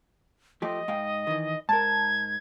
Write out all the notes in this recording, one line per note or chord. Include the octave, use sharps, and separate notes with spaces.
F3 A3 G4 D#5
G#2 F5 G5
D#3 E3
G#2 A#4 A5 G#6